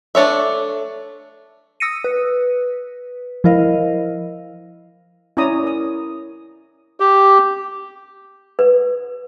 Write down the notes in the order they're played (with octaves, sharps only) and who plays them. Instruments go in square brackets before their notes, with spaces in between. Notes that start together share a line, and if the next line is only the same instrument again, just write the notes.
[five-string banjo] A3 D4 C#5 E5
[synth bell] D#6 E6 A#6 C#7 D#7
B4
F3 E4 A#4 D#5 F5
[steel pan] C#4 E4 C#5 D5 A#5 D#6
A#4 D#6
[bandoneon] G4
[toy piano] B4